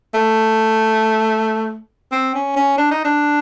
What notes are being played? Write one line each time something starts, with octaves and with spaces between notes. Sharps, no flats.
A3
C4
C#4
C#4
D4
D#4
D4